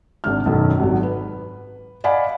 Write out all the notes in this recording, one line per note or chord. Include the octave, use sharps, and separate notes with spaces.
G#1 D4 F6
B1 F#2 D#3
G#1 F#3
B4
D5 D#5 F5 F#5 G#5 B5